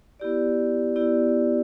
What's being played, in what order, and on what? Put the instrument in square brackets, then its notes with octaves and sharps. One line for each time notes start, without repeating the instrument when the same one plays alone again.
[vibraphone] B3 E4 G4 D5
B3 E4 G4 D5